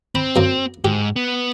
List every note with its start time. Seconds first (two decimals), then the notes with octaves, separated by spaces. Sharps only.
0.15 C4 B5
0.36 F#2 A#3
0.85 G#2 G4
1.16 B3